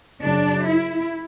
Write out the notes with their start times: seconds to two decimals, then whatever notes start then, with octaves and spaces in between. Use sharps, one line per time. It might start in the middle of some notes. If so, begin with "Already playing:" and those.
0.21 F#2 C#3 F#3 D4
0.66 E4